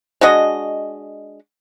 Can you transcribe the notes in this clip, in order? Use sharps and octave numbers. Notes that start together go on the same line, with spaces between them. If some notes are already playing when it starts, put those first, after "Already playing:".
G#3 D4 F#4 D#5